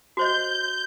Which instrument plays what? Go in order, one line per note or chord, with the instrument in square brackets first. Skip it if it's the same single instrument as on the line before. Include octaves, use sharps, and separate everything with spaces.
[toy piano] F#4 C5 D#5 [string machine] G6